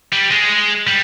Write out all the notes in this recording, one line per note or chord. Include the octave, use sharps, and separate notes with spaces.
G3
G#3
G3